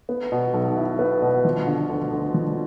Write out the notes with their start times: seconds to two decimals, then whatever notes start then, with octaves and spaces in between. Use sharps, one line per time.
0.09 B3
0.32 B2
0.53 B1
0.77 E4
0.99 B3
1.22 B2
1.45 F3
1.67 D3
1.89 D2
2.12 D2
2.34 F3